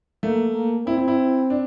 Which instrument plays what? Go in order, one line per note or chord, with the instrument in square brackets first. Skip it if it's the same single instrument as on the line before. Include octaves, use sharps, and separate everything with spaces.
[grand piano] A3 [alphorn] A#3
[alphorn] A#3
[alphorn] C4 [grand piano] E4
[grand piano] E4
E4
D4